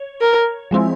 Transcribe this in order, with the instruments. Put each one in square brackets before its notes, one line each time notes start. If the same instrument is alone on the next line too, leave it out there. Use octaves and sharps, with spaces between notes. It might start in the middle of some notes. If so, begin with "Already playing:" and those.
Already playing: [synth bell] C#5
[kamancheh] A#4
[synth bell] F3 G#3 C4 E4